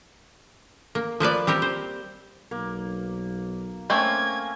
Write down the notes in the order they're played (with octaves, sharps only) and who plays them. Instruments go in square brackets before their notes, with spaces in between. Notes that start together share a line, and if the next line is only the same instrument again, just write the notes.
[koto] A#3
F3 A#3 B4 D5
G3 C4 G4 A#4
C5
[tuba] B1 [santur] A#3
[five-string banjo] A3 A#3 [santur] C4 C#4 C5 [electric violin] G#6